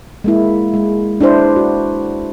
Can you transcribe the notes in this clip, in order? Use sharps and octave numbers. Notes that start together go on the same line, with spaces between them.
G#3 A#3 E4
G#3
D4 E4 B4 C5
F#4